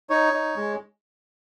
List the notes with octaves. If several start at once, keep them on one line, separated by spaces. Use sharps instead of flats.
D#4 C#5
D#4
G#3